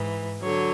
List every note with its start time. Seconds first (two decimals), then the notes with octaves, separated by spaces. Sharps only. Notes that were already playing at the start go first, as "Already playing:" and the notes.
Already playing: G#2 E3
0.42 D3 F#3 C#5